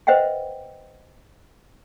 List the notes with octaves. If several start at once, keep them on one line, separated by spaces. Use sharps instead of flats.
B4 C5 D#5 E5 F#5 G5